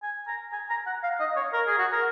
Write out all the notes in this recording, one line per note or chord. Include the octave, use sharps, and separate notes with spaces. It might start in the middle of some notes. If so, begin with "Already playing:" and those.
G#5
A#5
G#5
A#5
F#5
F5
D#5
C#5
A#4
G#4
F#4
A#4